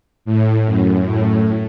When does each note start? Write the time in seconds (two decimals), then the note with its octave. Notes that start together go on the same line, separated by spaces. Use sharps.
0.25 A2
0.66 F#2
1.06 A2